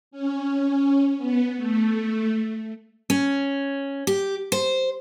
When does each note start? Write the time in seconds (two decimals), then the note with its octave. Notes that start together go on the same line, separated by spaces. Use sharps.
0.11 C#4
1.17 B3
1.56 A3
3.10 C#4
4.07 G4
4.52 C5